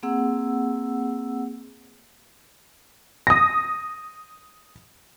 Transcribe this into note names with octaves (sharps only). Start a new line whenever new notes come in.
A#3 C4 G#4 F#5 E6
D#6 A#6